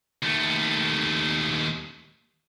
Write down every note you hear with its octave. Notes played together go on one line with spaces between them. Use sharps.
D#2 A3